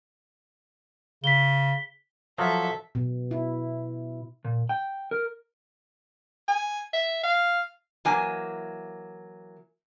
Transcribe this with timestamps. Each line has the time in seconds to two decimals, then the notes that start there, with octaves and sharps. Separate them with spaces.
1.24 C#3 B6 G7
2.38 F3 F#3 A4 E5
2.95 B2
3.31 E4
4.45 A#2
4.69 G5
5.11 A#4
6.48 G#5
6.93 E5
7.23 F5
8.05 E3 F#3 A#3 G#5